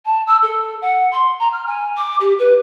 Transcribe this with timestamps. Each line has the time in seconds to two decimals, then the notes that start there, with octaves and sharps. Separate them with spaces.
0.05 A5
0.26 E6
0.42 A4
0.81 F#5
1.11 C6
1.39 A#5
1.52 F6
1.66 G#5
1.96 D6
2.20 G4
2.38 B4